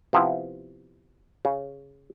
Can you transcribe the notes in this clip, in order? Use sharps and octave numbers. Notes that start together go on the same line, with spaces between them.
C3 F3 B3 E4
C#3